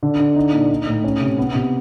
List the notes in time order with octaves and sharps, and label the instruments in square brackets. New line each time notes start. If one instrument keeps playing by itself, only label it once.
[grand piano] D3
D3
D#4
A#2
D#4
A2
C#4
C3
B3
C3